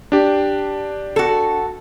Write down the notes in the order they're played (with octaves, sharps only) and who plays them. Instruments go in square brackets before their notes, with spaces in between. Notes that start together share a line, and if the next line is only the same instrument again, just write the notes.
[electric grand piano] D4 G4
[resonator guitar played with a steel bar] F#4 A4